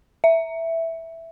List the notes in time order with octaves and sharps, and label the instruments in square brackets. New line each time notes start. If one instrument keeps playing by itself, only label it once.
[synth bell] E5